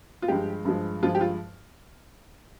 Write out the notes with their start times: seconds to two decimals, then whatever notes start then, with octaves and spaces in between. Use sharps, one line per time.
0.22 F4
0.28 G2 F3 G#3 G4
0.65 G2 F3 G#3
1.03 G2 F3 G#3 F4
1.15 G4
1.21 F4